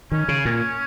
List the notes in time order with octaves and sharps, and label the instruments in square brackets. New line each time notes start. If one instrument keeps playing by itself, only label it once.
[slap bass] D#3 [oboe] C#4
[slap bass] C#3
A#2